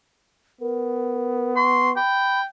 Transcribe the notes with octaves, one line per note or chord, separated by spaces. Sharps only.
B3 A#4
C6 C#6
G5 B5